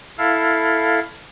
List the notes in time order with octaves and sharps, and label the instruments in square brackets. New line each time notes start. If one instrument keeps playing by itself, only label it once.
[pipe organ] E4 A4 F5